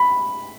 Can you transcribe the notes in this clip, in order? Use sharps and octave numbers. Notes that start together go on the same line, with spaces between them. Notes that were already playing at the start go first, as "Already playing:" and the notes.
Already playing: B5